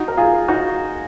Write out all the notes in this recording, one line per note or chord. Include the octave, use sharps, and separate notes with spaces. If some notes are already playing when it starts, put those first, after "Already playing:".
Already playing: D#4 F#4
A#4
F4 G#4
D#4 F#4